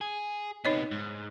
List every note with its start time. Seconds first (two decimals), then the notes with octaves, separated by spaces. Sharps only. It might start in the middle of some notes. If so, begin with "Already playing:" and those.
0.01 G#4
0.65 C3 B3 D#4 C#5 D#5
0.91 G#2